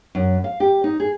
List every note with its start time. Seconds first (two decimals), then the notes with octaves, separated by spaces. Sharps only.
0.15 F#2
0.44 F5
0.60 G4
0.84 D#4
1.00 G#4